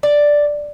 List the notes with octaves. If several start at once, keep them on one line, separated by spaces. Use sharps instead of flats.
D5